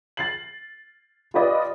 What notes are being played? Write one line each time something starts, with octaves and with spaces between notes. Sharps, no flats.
A6 C7 F#7
F4 G4 B4 D5 D#5